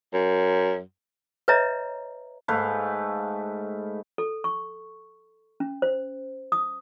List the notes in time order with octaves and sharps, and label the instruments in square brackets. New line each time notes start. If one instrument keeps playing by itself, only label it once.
[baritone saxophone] F#2
[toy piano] B4 C#5 D#5 E5 A#5
[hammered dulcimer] G#2 A3 B4 F5
[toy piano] A4
C#6
C#4
C5
D#6